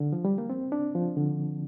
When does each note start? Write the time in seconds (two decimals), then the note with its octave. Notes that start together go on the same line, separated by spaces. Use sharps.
0.00 D3
0.13 F3
0.25 G3
0.38 A#3
0.50 C4
0.72 D4
0.95 F3
1.17 D3